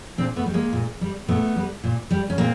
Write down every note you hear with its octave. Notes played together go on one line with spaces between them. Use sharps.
A#2 C4 D4
A3 B3
G3
G#3 A#3
A#2
G3
A#2 A3 B3
G3
A#2
G3
C#4
A#2 A#3 C4